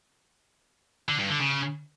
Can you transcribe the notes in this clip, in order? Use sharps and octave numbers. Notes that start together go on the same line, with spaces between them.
D3
G2
D3
C#3